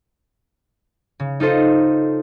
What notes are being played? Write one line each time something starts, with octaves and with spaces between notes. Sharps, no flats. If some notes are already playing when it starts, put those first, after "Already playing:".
C#3
D#4 F4 A4 C5 D#5